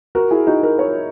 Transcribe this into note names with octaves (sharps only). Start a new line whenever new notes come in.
F#4 A#4
E4 G#4
D#4 F#4
F#4 A#4
A#4 C#5